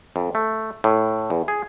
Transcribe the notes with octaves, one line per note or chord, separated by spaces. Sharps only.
F2
A3
A2
E2
G#4